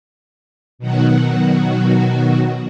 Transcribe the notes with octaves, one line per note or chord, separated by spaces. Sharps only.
B2 D#3 F#3 F#4